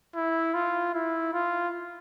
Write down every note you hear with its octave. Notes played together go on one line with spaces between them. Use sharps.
E4
F4
E4
F4